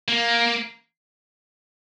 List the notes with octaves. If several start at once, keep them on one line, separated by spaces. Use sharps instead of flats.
A#3